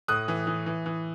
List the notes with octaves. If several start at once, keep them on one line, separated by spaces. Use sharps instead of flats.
A2 D#6 F#6
E3
E3
E3
E3